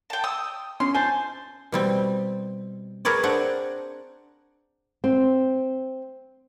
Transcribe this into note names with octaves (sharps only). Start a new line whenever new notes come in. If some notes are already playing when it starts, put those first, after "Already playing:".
G5 A5
D#6 E6
C#4 C6
C5 G#5 A5
B2 G3 C4
G#4 A#4 B4 C#5 D5
C4 D4 F#5
C4